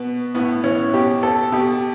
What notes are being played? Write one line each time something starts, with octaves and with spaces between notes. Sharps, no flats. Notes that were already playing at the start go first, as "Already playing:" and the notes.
Already playing: B2 B3
A2 B3
E3 C#4
B2 G4
A4
B2 G4